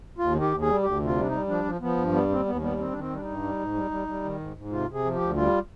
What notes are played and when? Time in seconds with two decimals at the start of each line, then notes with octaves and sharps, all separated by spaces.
0.18 D#2 F4
0.34 D#3
0.41 G4
0.52 D#2
0.61 G#4
0.68 G3
0.83 D2 G4
1.00 C3
1.06 F4
1.16 G3
1.21 D4
1.26 D#4
1.31 G3
1.48 F3 D4
1.65 F3
1.81 F3 B3
1.97 G2
2.13 G3 B3
2.29 D#2 C4
2.46 D#2 B3
2.61 G3 B3
2.78 D#3 C4
2.91 D#3 D4
2.99 C4
3.10 G3
3.15 D4
3.22 G2 D#4
3.43 G3
3.59 G#2
3.74 G3
3.91 G3
4.08 G3
4.24 D#3
4.40 G#2
4.56 G#2
4.71 C3 F4
4.89 C3 G#4
5.05 F3
5.15 G4
5.21 D2
5.36 G3 F4